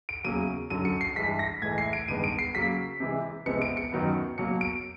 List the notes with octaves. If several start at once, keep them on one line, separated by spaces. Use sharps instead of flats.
D7
E2 C#3 F#3 A#3 D#7
F#2 D3 F#3 D#7
C#7
C7
G2 E3 G#3 B6
A#6
A2 E3 G#3 G#6
C7
D7
G2 D#3 G#3 B3 D#7
D7
C7
C#3 F#3 A#3 B6
C3 E3 G#3
C3 F3 G#3 B3 C#7
D7
C#7
F#2 D#3 F#3 B3
B2 F#3 A#3 C#7
D7